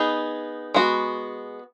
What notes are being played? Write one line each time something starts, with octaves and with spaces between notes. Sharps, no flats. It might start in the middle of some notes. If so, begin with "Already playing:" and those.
Already playing: B3 D#4 G#4
G#3 B3 F#4